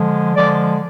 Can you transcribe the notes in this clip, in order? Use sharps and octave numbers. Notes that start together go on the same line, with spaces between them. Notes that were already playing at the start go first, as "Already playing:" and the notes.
Already playing: D3 F3 G#3
D3 F3 G#3 D5